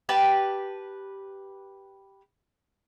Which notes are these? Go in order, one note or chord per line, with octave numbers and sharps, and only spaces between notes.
G4 B4 A5